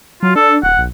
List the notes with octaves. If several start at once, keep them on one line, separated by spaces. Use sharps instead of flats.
F#3 F4
D4 A4
D1 F#5
B1